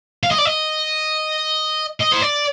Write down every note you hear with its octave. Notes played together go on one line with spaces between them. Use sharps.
F5
D#5
D5
D#5
D#5
C5
D5